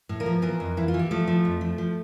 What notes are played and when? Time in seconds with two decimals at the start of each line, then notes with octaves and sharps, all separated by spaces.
0.09 A2
0.20 A#3 A#4
0.26 F3
0.42 E3 A#3 A#4
0.60 F2
0.77 E3 E4
0.88 F4
0.94 E3
0.99 G4
1.11 F3 A3 A4
1.27 F3
1.45 F2
1.61 F3
1.78 F3